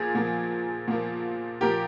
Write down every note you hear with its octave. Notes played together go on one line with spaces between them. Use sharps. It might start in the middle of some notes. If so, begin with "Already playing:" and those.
Already playing: A#2 F3 G#4
A#2 F3 A#3
A#2 F3 A#3
A#2 F3 A#3 G4 A#4